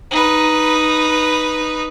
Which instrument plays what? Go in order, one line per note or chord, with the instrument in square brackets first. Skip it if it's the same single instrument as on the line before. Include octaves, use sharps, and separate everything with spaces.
[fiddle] D#4 B4